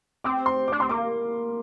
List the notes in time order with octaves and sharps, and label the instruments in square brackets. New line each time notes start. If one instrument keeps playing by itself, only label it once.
[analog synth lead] C4 [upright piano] D6
[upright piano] C6
D6
[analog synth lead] D4
[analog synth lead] C4 [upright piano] C6
[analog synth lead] A#3 [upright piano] D6